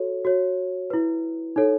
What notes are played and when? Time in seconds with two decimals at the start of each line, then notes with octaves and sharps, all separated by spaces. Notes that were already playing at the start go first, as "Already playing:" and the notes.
Already playing: F#4 A4 C#5
0.25 F#4 C#5
0.90 E4 B4
1.56 D#4 A4 C#5